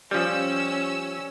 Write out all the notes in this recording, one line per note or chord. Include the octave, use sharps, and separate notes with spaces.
F3 G3 C#4 E6